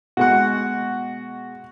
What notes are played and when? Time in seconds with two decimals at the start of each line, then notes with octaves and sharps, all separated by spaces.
0.17 B2 G#3 F#4 F#5